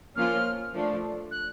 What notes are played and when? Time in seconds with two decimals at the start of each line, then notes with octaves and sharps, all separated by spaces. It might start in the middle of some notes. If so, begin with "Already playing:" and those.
0.16 F3 A#3 C#4 F4 F6
0.74 F3 A3 D4
1.31 F#6